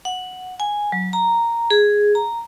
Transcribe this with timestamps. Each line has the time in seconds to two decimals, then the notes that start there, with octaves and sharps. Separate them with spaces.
0.05 F#5
0.60 G#5
0.92 F#3
1.13 A#5
1.71 G#4
2.15 A#5